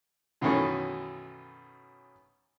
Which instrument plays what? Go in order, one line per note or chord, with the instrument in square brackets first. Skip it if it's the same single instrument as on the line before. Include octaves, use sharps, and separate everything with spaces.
[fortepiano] F#2 B2 D#3 E3 A3 C#4